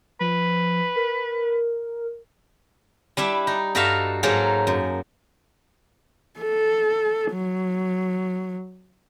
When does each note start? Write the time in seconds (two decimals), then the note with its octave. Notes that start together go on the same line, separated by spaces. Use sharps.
0.20 F3 B4
0.96 A#4
3.17 G3 D4 E4 E5
3.47 D#4
3.75 G2 D#4 F#4 A4 E5 F5
4.23 G#2 F#3 A#3 D#4 G#4 A4
4.67 F#2
6.40 A4
7.33 F#3